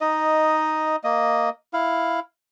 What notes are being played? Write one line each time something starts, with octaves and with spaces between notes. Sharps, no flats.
D#4 D#5
A#3 D#5
E4 F5